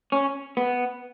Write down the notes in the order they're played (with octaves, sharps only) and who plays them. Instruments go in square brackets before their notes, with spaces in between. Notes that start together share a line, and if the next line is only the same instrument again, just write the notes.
[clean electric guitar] C#4
B3